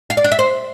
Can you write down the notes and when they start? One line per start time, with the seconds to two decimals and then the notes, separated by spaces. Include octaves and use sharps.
0.10 F5
0.17 D5
0.24 D4
0.32 E5
0.39 C5